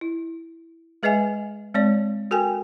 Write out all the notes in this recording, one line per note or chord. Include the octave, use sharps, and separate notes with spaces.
E4
G#3 G#4 B4 D#5 E5 G#5
G#3 C4 C#5 D5
F#4 A4 A#4 G5 G#5